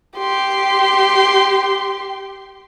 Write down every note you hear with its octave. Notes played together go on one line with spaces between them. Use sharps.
G4 C6